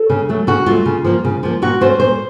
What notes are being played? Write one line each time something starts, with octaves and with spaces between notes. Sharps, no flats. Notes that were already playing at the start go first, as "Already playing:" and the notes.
Already playing: A4
C#3
F#3 A3
C#3 F#4
F#3 A3 F4
C#3
F3 A#3
C#3
F3 A#3
A#2 F#4
A3 C#4 C5
A#2 C5